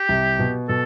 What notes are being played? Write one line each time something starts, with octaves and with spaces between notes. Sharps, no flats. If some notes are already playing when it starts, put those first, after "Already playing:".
Already playing: G4
C2 C3
B2
B2 A4